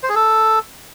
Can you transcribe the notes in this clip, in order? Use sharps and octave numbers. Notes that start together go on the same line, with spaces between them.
C5
G#4
A4